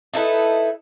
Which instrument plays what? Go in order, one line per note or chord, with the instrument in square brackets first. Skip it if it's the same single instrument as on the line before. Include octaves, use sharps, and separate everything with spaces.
[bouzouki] D#4 E4 A4 B4